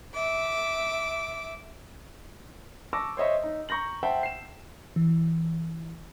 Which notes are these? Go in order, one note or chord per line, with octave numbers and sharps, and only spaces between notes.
E5 D6
A5 C#6 D6 E6 A#6
C5 C#5 D#5 E5 C#6
D#4
A#5 C#6 G6 A#6 F#7
C5 E5 F#5 G5 A5
C7 E7
E3